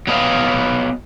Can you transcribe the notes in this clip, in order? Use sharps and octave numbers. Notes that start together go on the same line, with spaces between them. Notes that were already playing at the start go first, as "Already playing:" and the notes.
F#3 B3 D#5 F5